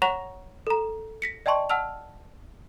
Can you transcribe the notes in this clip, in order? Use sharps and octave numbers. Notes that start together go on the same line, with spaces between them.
C#5 F#5 A#5 C#6 A#6 F7
A4 A#5
A#6 B6 C#7
D5 D#5 G5 A5 C6 C#6
F#5 A5 E6 F6 F7